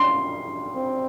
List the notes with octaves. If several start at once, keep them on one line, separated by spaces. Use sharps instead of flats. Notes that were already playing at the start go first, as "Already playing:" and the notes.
Already playing: C#4 C6
C4